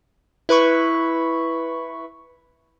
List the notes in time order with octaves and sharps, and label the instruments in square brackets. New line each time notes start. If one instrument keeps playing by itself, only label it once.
[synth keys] E4 B4 B5 C#6